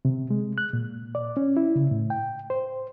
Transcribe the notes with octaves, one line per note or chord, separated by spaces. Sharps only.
C3
G#3
F#6
A#2
D5
C#4
E4
C#3
A2
G5
C5